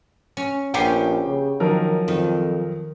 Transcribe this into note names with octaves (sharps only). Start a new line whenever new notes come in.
C#4
A#1 B3 C#4 G4 G5 C7
C#3
D#3 F3 F#3 A#4
F2 D#3